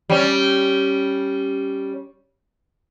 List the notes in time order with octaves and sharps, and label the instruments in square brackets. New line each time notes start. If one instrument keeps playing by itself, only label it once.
[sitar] G3 C#4